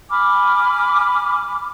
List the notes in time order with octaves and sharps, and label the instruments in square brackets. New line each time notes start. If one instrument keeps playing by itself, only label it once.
[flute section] G#5 B5 D6 F6